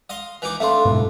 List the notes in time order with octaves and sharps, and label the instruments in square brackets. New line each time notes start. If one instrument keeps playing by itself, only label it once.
[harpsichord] D#5 F5 C6
E3 D#4 D6
[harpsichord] A3 D4 [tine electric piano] E5 F5 C6
[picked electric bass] F#1 G#2 B2